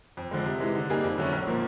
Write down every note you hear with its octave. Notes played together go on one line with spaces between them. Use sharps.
F2
D3 F3 G#3
C3
E3 G#3
D3
G3 A#3 D#4 G#4
F2
D3 F#3 A3 C#4
B1
A#2 F3 A#3